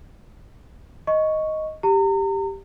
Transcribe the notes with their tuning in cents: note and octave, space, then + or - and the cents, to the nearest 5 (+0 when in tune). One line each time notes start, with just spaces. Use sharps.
D#5 +5 C#6 +0
G4 +0 A#5 -35